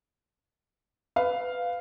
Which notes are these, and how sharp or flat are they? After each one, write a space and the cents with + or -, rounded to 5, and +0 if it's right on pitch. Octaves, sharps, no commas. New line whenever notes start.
B4 +20 F5 +0